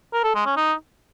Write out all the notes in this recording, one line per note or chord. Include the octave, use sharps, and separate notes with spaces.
A#4
A4
G#3
C#4
D#4